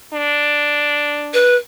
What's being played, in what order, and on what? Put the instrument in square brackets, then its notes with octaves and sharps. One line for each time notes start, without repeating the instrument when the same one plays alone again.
[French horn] D4
[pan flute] B4